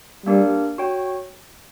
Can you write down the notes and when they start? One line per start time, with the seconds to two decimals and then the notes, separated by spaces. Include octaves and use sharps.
0.26 G3 A#3 D4 G4 A#4
0.78 F#4 C#5 G5